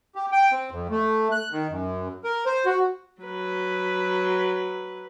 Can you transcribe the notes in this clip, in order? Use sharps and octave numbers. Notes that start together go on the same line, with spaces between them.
G4
G5
C4
F2
A3
F#6
D#3
F#2
A#4
C5
F#4
F#3 B4